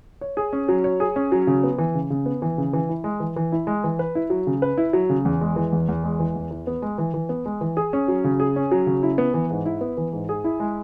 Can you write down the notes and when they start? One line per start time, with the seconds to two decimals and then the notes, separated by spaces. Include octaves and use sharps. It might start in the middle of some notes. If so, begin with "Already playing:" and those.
0.21 C#5
0.37 G#4
0.53 C#4
0.68 F#3
0.84 C#5
1.00 G#4
1.16 C#4
1.32 F#3
1.47 C#3
1.64 B3
1.78 E3
1.95 C#3
2.10 C#3
2.26 B3
2.42 E3
2.58 C#3
2.73 E3
2.89 E4
3.04 G#3
3.20 E3
3.36 E3
3.52 E4
3.67 G#3
3.84 E3
3.99 B4
4.15 E4
4.30 F#3
4.47 C#3
4.62 B4
4.78 E4
4.93 F#3
5.09 C#3
5.25 E2
5.41 G#3
5.56 E3
5.73 E2
5.89 E2
6.04 G#3
6.20 E3
6.36 E2
6.51 E3
6.67 B3
6.82 G#3
6.98 E3
7.14 E3
7.29 B3
7.46 G#3
7.61 E3
7.77 G#4
7.93 C#4
8.08 F#3
8.24 C#3
8.40 G#4
8.56 C#4
8.71 F#3
8.86 C#3
9.03 E4
9.18 B3
9.34 E3
9.51 G#2
9.66 E4
9.81 B3
9.97 E3
10.13 G#2
10.29 G#4
10.44 E4
10.60 G#3